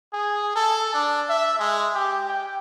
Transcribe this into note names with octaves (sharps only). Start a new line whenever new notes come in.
G#4
A4
D4
E5
G#3
G4
G5